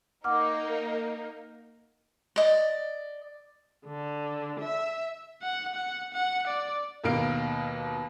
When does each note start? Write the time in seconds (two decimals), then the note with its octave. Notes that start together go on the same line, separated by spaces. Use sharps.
0.24 A#3 D#4 A#4 F#5 D6 F6
2.36 D5 D#5
3.86 D3
4.60 E5
5.43 F#5
5.75 F#5
6.14 F#5
6.47 D5
7.04 D#2 B2 A#3 F5 D7